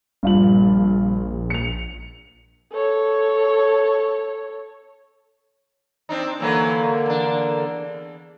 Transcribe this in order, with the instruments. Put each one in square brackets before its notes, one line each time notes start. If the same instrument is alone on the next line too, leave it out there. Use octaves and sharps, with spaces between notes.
[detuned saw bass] A#1 [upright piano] G2 F4 F#7
[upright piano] C#7 F7
[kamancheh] A4 C#5
[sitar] C4 D4 D#4
[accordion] D3 A#3 [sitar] E3 F#3 B4
[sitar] E2 D4